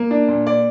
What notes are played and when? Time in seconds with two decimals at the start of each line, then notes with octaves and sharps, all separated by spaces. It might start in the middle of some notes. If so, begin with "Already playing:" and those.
Already playing: A#3
0.11 D4
0.28 A#2
0.47 D5